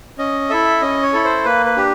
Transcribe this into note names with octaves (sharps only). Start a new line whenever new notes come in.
C#4 D#5
E4 A4 E5
C#4 D#5
C#5
E4 A4
C5
A#3 B4
B4
D4 G4